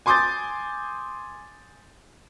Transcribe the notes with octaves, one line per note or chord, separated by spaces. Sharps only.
G#5 C6 D6 D#6 G6 A6